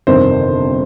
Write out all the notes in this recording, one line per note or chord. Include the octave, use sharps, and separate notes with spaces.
G1 F2 C3 D#3 C5